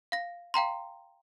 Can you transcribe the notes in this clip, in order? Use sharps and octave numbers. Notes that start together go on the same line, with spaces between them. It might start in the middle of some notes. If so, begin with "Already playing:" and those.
F5 A#6
F5 G5 A#5 C6